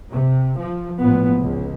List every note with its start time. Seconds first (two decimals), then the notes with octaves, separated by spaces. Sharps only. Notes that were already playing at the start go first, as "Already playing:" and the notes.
0.12 C3
0.59 F3
1.00 A1 A#2 F3 B3
1.40 C#2